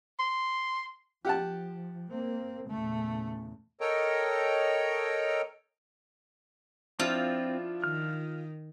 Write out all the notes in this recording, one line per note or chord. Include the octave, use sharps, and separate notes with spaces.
C6
F3 G4 F#5 A5
A#3 C4
E2 A#2 C#3 A3
A4 A#4 C#5 D#5 G5 A#5
F3 C4 D4 E4 F4
D#3 F6